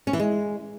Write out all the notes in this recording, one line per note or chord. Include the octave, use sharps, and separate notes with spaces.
C#4
E3
G#3